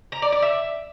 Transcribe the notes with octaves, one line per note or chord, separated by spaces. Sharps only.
A#5
D5
D5
E5